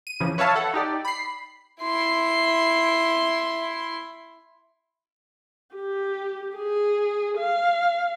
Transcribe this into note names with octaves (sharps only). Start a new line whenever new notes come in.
D#7
C#3 E3 F3
B4 C#5 E5 F5 A5
A4 F#5
D#4 G4 D5
B5 C7
E4 C6
G4
G#4
F5